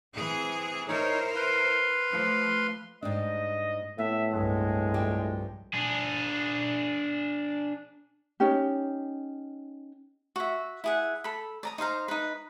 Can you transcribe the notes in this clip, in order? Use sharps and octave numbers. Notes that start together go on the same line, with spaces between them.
E3 C4 G#4
D#4 E4 A#4 C5 C#5
B4 F5 C6
F3 A3
G#2 G3 D4 D#5
A2 B3 E5
C2 G2 G#3
F3 G3 G4
D4 G#4
C#4 D#4 G4
F#4 E5
E4 G#4 F#5
A4 B5
D5 A#5 D#6
D#4 C5 F5 A#5
D#4 B4